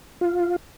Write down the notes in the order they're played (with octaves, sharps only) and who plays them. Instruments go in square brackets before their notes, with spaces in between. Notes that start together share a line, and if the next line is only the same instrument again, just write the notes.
[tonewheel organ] F4